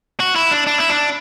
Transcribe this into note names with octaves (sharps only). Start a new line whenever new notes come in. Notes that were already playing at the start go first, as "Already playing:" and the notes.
F#4
E4
D4
D4
E4
D4